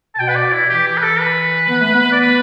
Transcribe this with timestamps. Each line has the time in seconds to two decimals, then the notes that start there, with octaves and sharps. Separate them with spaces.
0.15 A5
0.19 B2 G5
0.29 B4
0.36 D5
0.52 E4
0.69 E3 G4
0.86 G4
0.97 B4
1.03 A4
1.19 B4
1.69 B3
1.82 A3
1.94 B3
2.12 D5
2.20 B4